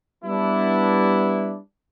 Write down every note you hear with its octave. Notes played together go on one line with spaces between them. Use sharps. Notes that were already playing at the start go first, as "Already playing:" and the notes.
G3 B3 D4 E4